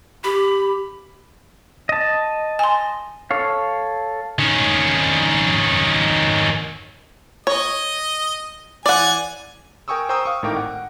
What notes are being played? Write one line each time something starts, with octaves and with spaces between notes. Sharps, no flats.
G4 B5
D#5 A5
G#5 C6
A4 C#5 F5
D#3 C#4
C#5 D#5
E3 D5 F#5 G#5
A#4 G5 G#5 C#6 D#6 E6
C5 G5 A#5 C#6 D#6 E6
F5 C#6 D#6 E6
G#1 A2 D#4 A#4 G5 D6
F#5